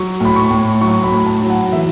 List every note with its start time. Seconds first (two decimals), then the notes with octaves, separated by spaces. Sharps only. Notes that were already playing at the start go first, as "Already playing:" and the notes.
Already playing: F#3 C#6
0.21 A2 B5
0.36 C#6
0.51 A2
0.81 F#3 C#6
1.04 B5
1.12 A2
1.27 A5
1.42 F#3
1.50 F#5
1.72 E3 E5